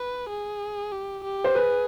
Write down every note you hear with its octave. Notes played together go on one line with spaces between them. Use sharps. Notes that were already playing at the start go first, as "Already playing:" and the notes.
Already playing: B4
G#4
G4
G4
C5
G#4 B4